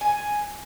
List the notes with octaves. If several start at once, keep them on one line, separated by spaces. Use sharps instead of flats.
G#5